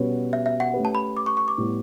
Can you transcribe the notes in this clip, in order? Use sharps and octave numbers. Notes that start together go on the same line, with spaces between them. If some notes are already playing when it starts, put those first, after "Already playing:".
Already playing: B2 G3 C#4 F#4 B4
E5
E5
F#5
A3 C#4 G4 B4
A5
B5
D6
C#6
C#6
D6
A2 G3 B3 E4